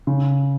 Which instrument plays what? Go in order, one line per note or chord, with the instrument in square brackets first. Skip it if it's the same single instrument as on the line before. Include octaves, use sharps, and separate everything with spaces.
[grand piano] C#3